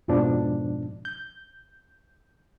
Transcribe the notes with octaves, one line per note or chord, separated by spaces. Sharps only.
F2 G#2 B2 F3 D4
G6